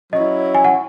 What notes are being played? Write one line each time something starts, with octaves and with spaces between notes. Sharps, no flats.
F#3 C#4 E4 D#5
G#5
F#5